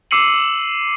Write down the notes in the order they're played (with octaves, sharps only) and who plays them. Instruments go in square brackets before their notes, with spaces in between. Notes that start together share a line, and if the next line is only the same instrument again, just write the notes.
[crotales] D6 E6 C7 C#7 D#7 F#7